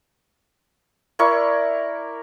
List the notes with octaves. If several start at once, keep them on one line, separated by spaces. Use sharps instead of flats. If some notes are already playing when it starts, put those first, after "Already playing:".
E4 A#4 D5 C#6